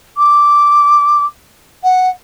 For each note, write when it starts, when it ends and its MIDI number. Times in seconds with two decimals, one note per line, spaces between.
0.17 1.25 86
1.83 2.09 78